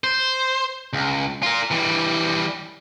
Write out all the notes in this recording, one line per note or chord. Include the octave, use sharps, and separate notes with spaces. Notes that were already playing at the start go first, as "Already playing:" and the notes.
C5
C#2
F4 A#4
E3 G3